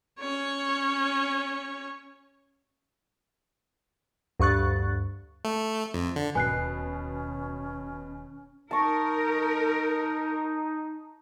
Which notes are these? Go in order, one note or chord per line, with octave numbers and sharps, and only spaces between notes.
C#4 C#5
D2 G2 C#6 F#6 A6
A3
F2
D3
D1 D#2 B2 C#4 G#5 F#6 C7
D#4 A#4 A5 C#6